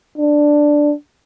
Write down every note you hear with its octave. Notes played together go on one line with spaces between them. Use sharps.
D4